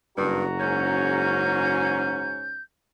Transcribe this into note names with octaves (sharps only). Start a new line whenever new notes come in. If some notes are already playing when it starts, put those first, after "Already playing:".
F#1 G2 F#4 A#5
G#2 C#4 G6